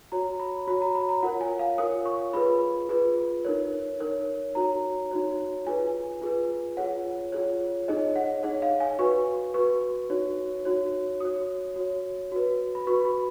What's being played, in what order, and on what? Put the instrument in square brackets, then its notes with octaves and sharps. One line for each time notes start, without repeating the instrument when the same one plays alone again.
[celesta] F#4 C#5 A#5
B5
F#4 C#5 B5
A#5
B5
A#5
F4 A#4 C#5 F#5
G#5
F5
F4 A#4 C#5 D#6
C#6
F4 G#4 B4 B5
F4 G#4 B4
D#4 A#4 C#5
D#4 A#4 C#5
D#4 F#4 C#5 A#5
D#4 F#4 C#5
F4 G#4 B4 G#5
F4 G#4 B4
F4 G#4 C#5 F#5
F4 G#4 C#5
D#4 G#4 C#5 D#5
F#5
D#4 G#4 C#5 F#5
F5
G#5
F#4 B4 C#6
F#4 B4 C#6
D#4 F#4 C#5
D#4 F#4 C#5
F#4 C#5 D#6
F#4 C#5
F#4 B4
B5
F#4 B4 C#6
B5